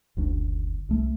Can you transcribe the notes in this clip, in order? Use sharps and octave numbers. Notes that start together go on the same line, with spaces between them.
F#1 D2 D4
C2 A3